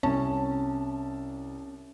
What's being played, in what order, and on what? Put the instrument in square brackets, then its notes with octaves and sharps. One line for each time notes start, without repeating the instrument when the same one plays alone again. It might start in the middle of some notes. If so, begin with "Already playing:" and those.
[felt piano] C2 A5 [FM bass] C#4